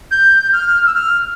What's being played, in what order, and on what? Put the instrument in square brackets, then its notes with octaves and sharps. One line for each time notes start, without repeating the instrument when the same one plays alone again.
[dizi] G6
F6
E6
F6